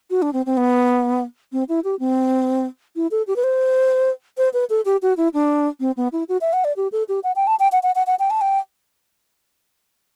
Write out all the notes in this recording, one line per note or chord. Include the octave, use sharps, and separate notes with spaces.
F#4
D4
C4
C4
B3
C4
E4
G4
C4
E4
A4
G4
B4
C5
C5
B4
A4
G4
F#4
E4
D4
C4
B3
E4
F#4
E5
F#5
D5
G4
A4
G4
F#5
G5
A5
G5
F#5
F#5
F#5
F#5
G5
A5
G5